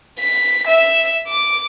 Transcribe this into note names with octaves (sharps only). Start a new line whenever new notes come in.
B6
E5
D6